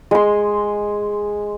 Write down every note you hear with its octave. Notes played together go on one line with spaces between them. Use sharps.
G#3 C6